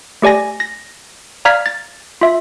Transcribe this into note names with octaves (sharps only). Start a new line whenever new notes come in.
A3 G4 D5 G#5 A#6
A#6
D5 F5 A#5 F6 G#6 B6
A6
F4 E5